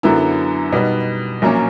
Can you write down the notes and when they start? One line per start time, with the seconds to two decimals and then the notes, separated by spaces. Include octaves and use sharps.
0.03 F#2 D3 F#3 B3 E4
0.73 B2 G3 B3 D#4
1.42 A#1 A#2 F#3 A#3 C#4